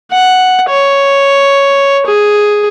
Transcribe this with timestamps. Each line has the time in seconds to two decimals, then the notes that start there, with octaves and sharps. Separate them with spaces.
0.12 F#5
0.69 C#5
2.06 G#4